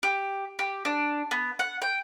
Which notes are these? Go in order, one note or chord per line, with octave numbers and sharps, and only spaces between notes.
G4
G4
D4
B3
F#5
G5